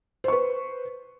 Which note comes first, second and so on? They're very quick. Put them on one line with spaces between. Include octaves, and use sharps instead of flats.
C5 C#6 B4